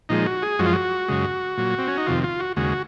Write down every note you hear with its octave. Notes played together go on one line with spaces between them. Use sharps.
A#2 F3 G#3 D#4
F#4
G#4
F#2 F3 G#3 F#4
F4
F#4
F#2 C#3 G#3
A#2 F#3
C4
C#4
D#4
F2 C3 D#3 F4
F4
F#4
D#2 C#3 G#3 F#4